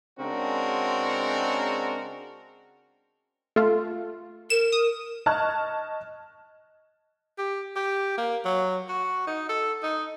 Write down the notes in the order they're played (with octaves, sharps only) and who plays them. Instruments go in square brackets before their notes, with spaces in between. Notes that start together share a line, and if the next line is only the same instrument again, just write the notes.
[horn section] C#3 G#3 C4 D4 F#4 A#4
[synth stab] A3 F4
[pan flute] A#4 [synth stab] E7
[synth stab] D#6
[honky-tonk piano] D#5 A5 C#6 F6 F#6 G#6
[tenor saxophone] G4
G4
A#3
F#3
F#4
D#4
A4
D#4